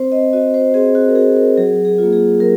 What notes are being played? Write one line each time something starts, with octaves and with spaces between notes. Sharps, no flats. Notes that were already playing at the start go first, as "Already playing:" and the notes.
Already playing: C4 C5
D#5
F#4 D#5
C5
C4 G#4
F#4
A#4
F#4 G#4
A#4
F#3 G#4
G#4
A#3 F4
G#4
F#3 A#4